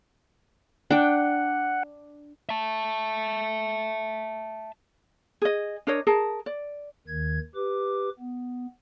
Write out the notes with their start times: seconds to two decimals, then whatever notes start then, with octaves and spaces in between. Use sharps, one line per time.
0.91 D4 F#5 G5
2.49 E5 A5
5.42 G#4 D#5
5.87 D4 A#4 C#5 D#5
6.07 G#4 A#4 A5
6.46 D5
7.07 D#2 D#3 G#6
7.55 G4 B4 D6
8.19 B3